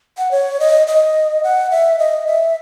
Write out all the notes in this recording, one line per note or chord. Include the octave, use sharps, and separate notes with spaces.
F#5
C#5
D#5
D#5
F#5
E5
D#5
E5